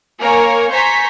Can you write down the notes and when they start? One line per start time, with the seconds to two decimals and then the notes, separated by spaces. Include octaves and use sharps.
0.20 A#3 A#4 C#5 G#5
0.72 C5 G#5 A#5 C#6 B6